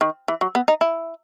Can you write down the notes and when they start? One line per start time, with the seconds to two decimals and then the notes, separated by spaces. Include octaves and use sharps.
0.01 D#3
0.28 E3
0.41 F#3
0.55 B3
0.68 D#4
0.81 E4